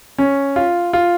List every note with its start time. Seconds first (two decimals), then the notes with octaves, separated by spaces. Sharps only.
0.18 C#4
0.56 F4
0.93 F4